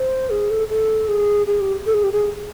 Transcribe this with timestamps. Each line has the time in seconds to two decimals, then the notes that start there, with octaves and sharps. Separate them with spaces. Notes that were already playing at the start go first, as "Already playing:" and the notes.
Already playing: C5
0.30 G#4
0.51 A4
0.69 A4
1.08 G#4
1.47 G#4
1.61 G4
1.86 A4
1.94 G#4
2.04 G4
2.12 G#4